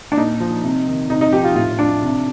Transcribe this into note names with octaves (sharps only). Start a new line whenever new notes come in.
D4
A#2 D#4
F3
C3
D#3
C3 D#4
D#4
F3 G4
F4
A2 F4
F3 D4
C3